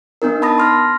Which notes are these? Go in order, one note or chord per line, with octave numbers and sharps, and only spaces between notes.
B3 D4 D#4 A#4
A5 B5 D#6 A#6
C6 F6 A#6